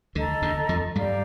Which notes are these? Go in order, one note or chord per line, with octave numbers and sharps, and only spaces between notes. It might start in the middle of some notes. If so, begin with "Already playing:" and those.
D2 D3 A4 D#5 A#5
D2 D3
F2 F3
G2 G3 G4 D5 F5 A#5